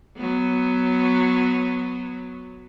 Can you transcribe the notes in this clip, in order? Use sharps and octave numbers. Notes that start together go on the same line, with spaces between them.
F#3 B3